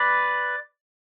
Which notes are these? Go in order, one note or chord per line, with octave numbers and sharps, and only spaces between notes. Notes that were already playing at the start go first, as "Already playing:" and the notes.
Already playing: B4 D5